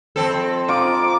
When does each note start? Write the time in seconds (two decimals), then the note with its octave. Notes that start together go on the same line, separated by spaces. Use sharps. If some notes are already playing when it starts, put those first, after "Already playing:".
0.16 F2 C4 A4
0.69 D#4 F4 D6